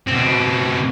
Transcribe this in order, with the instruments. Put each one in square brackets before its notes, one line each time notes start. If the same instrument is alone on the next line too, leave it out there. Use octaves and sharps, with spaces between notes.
[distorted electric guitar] B2 C4